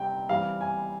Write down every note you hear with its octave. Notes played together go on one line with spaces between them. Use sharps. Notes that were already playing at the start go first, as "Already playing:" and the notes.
Already playing: C3 G3 C4 G5
E3 G3 C4 F5
G#5